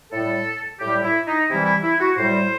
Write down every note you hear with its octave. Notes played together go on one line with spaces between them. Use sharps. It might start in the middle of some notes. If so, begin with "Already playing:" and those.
A2 G3 A4
A2 G3 G4
E4
D#4
C3 E3 G3 E4
E4
E4
F#4
A2 G3 C5